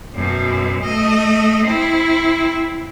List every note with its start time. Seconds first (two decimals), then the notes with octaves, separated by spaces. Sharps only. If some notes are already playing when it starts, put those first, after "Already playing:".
0.15 F#2 B2
0.85 A3 D#5
1.67 C4 E4